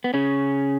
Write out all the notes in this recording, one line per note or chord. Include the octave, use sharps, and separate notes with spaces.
B3
C#3 C#4